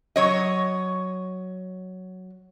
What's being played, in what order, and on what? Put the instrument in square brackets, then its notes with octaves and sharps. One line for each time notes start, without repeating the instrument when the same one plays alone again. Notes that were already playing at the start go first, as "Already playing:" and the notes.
[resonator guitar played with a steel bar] F#3 C#5 D#5